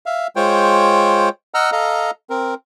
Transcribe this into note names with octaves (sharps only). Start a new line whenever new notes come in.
E5 F5
G#3 F4 C5 C#5 G5
D#5 F#5 A#5 E6 F6
A4 D#5 F5 A#5
C4 A#4